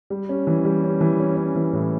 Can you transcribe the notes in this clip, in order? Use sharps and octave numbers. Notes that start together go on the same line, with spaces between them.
G3
C#4
E3
G3
C#4
E3
C#4
C#4
E3
A2